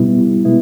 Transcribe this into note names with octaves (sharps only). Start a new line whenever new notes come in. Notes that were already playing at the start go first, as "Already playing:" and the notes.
Already playing: B2 G3 B3 E4
B2 G#3 B3 E4